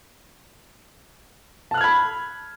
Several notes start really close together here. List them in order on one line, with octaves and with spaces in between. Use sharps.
A5 F#6 F6 G#6 B5